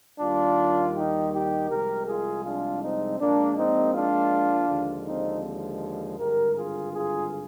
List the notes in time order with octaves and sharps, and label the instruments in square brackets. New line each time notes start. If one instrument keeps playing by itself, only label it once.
[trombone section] D#2 D#3 G3 D4 F4
D#4 G4
D#4 G4
C2 C3 F3 G#3 G4 A#4
F4 G#4
D4 F4
C4 D#4
A#1 A#2 G#3 A#3 D4
C4 D#4
D4 F4
D#2 D3 F3 G#3
C4 D#4
G#1 G2 D3 G4 A#4
F4 G#4
F4 G#4